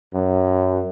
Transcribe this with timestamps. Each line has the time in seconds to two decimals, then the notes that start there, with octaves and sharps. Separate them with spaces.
0.14 F#2